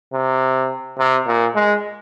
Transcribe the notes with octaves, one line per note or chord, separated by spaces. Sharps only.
C3
C3
A#2
G#3